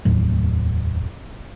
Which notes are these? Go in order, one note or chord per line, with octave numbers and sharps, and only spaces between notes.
F1 D#2 A2 F#3